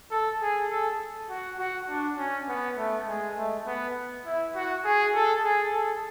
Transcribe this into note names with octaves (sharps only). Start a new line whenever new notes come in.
A4
G#4
A4
F#4
F#4
D4
C#4
B3
A3
G#3
A3
B3
E4
F#4
G#4
A4
G#4
A4